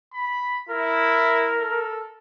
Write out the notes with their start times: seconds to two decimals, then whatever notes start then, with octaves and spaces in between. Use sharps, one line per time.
0.13 B5
0.69 E4 A#4
1.61 A4